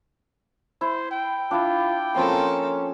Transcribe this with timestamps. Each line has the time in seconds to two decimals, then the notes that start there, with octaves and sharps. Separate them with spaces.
0.81 E4 C5
1.11 G5
1.51 D4 E4 F4
2.15 F3 A#3 C4 C#4 A4 C6